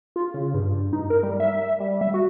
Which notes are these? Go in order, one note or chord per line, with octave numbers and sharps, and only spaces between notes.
F4
C#3
G2
D#4
A#4
G3
E5
G3
E5
F#4